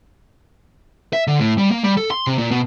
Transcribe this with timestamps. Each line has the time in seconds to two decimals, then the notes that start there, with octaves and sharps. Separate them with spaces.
1.13 E5
1.27 D3
1.39 A2
1.58 G3
1.71 A#3
1.84 G3
1.97 A4
2.11 C6
2.27 C3
2.38 A#2
2.51 B2